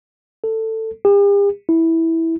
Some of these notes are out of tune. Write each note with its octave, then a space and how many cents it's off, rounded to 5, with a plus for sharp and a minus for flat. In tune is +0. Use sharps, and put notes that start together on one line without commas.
A4 +15
G4 +45
E4 -10